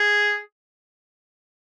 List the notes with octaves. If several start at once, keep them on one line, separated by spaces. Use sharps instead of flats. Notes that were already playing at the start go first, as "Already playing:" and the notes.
Already playing: G#4